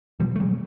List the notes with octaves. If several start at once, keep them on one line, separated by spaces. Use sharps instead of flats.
B2 F3 G3
A3
B2 F#3 G#3